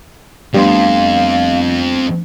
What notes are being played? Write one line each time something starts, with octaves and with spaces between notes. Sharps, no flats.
F2 G3 A3 B3 D4 F5 C6